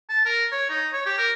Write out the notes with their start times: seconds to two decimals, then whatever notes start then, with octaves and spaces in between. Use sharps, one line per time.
0.10 A5
0.25 A#4
0.52 C#5
0.69 D#4
0.93 C#5
1.06 G4
1.18 A#4